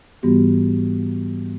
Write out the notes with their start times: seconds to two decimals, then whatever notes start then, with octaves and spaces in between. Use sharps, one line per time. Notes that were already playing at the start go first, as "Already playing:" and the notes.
0.23 G#2 E3 G3 B3 F#4 G4